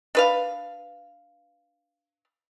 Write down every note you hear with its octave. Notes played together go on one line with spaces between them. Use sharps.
D4 B4 F5